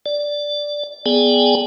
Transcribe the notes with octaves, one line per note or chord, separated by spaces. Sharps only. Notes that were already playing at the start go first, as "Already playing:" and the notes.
D5
B3 G#4 D5 G5 G#5